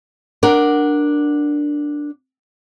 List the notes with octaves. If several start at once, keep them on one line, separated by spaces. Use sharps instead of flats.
D4 A#4 F#5